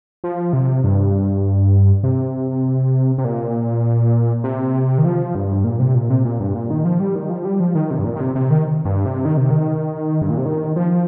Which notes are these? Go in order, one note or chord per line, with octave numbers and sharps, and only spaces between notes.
F3
C3
G2
C3
C3
A#2
C3
D#3
F3
G2
A#2
C3
A#2
C3
A#2
G2
A#2
D#3
F3
G3
D#3
F3
G3
F3
D#3
C3
G2
A#2
D#3
C3
C3
D#3
G2
C3
D#3
C3
D#3
G2
A#2
C3
D#3
F3